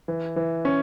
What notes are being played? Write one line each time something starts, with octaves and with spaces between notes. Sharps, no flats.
E3
E3
C#4